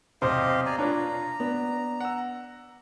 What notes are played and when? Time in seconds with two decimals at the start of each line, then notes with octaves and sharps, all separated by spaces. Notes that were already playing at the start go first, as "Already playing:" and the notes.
0.22 B1 E2 C3 G4 C5 D#5 F5
0.66 D5 G#5 A#5
0.78 D4 F4 B4 C#5 A#5
1.40 B3 D4
2.00 F#5 E6